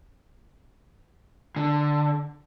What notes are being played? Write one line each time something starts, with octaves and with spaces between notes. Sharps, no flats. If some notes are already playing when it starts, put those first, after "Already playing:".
D3